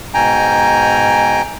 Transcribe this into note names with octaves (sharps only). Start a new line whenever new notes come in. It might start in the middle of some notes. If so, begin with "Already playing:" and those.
G#2 B2 G5 G#5 A#5